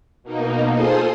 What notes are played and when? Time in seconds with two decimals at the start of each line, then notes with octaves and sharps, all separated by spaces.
0.23 B2 A#3 D#4
0.72 F4 G#4 A4 C5 C6 D#6